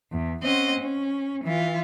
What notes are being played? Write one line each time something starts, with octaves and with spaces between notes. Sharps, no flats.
E2
C4 C#4 D#5 F#5
C#4
E3 F4